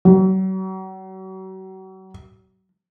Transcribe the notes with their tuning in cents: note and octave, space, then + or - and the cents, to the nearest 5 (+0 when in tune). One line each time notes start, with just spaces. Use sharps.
F#3 +40